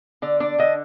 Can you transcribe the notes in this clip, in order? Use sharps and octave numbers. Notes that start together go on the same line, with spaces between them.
D3 D5
D4 D5
D3 D#5